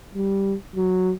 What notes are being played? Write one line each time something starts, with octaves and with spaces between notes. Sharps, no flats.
G3
F#3